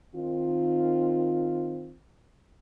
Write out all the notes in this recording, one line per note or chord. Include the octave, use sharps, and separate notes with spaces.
D#3 C4 F4